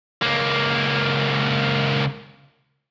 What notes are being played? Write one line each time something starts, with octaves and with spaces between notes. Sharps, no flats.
C#2 A#3